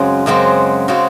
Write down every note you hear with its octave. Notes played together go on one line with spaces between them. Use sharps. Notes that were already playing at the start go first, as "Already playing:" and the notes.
Already playing: F#2 C#3 G#3 C4 F#4
F#2 C#3 G#3 C4 F#4
C#3 G#3 C4 F#4